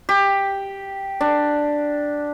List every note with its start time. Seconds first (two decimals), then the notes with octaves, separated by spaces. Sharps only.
0.09 G4
1.21 D4